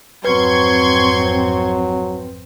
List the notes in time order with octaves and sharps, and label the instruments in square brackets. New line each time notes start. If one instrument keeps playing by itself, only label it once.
[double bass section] G#1 F2 C4 [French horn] F#3 [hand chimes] B4 [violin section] C6 C#6 G#6